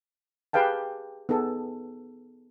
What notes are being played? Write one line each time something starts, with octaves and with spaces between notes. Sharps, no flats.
G4 G#4 B4 F5 G5 A5
B3 D#4 G#4 A4